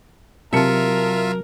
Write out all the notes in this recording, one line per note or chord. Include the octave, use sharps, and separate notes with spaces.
C3 F#3 F4 A#4 E5 A5 C#7